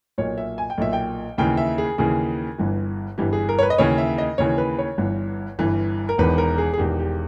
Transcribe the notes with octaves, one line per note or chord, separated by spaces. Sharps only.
B1 A#2 C#5
E5
G#5
G5
B1 A#2 E5
G5
D#2 C#3 E3 G5
E5
G#4
D#2 C#3 E3 G#4
G1 G2 E3
G1 G2 E3 G4
G#4
A#4
C#5
B4
D#5
D#2 C#3 E3 C#5
E5
D#5
D#2 C#3 E3 C#5
B4
C#5
G1 G2 E3
G1 G2 E3
A#4
E1 E2 D#3 B4
A#4
G#4
G#4
E1 E2 D#3 G4
G4